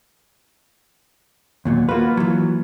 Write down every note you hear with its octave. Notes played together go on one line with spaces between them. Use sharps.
D#2 A#2 F#3
A#3 F4 F#4 B4
E3 F#3